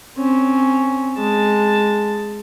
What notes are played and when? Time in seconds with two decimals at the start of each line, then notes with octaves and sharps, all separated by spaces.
0.18 C4 C#4
1.17 G#3 A5